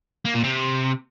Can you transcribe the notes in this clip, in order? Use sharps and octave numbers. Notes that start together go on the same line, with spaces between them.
A#3
A#2
C3